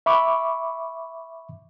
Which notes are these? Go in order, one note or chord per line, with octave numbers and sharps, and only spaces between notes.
E5 B5 C#6 D6